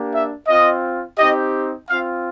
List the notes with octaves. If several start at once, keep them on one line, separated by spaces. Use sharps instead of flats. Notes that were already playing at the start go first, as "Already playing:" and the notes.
Already playing: A#3 D4 G4
E5
C4 F4 D#5
C4 D#4 G4 D#5
C4 F4 F5